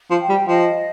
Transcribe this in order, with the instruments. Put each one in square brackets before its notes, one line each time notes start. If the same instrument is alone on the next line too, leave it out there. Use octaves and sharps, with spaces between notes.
[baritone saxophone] F3
[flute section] G5
[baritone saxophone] G3
[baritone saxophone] F3 [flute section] D#5